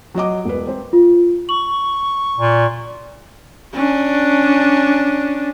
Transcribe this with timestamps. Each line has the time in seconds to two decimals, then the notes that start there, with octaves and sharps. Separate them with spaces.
0.15 F#3 F#4 D#5 D6
0.45 E1 B4
0.67 C4 C5
0.93 F4
1.49 C#6 F#7
2.38 A#2
3.74 C#4 D4